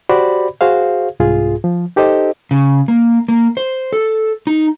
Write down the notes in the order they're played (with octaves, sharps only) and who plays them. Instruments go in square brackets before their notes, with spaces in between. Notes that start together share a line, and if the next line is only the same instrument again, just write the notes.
[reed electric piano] F#4 G4 C5 D5 B5
F#4 G#4 C5 F5
C2 G#2 F4 G#4
F3
D#4 G4 A4 C5 D#5
[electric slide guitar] C#3
A#3
A#3
C5
A4
D#4